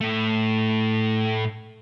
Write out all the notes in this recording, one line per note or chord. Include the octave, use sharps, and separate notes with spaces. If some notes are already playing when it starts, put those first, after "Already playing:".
A2 A3